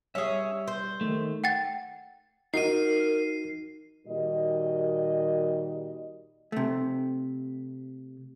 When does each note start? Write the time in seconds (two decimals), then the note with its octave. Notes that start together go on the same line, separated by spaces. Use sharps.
0.15 G3 C#4 G#4 E5
0.67 C5
1.01 D#3 A3
1.44 F#5 G5 A6
2.54 D#4 F#4 A#4 C7 D#7
4.06 A#2 D#3 G3 F#4 A#4 D#5
6.52 C3 A3